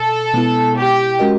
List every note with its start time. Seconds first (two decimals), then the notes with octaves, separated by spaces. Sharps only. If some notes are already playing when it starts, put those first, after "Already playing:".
Already playing: B2 A4
0.34 B2 G#3 B3 E4
0.77 G4
1.19 G#3 C#4 F#4 A#4 D#5